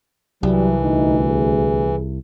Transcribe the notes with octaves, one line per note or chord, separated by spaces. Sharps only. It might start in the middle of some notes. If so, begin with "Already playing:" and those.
C2 E3 F#3 G3
D2 D#4
G#4